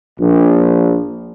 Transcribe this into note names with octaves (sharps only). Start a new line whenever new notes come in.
A#1